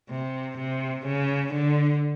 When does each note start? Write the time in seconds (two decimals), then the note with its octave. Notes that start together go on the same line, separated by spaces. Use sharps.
0.10 C3
0.57 C3
1.06 C#3
1.53 D3